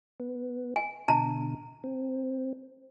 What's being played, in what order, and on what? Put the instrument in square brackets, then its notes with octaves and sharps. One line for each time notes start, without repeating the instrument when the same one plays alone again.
[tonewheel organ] B3
[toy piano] G#5
[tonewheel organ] B2 D3 [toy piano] A5 A#5
[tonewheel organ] C4